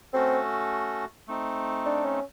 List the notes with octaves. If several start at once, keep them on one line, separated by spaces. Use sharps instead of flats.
A3 C4 C#4 F#4 A4
A3 C4 D#4
D4
C#4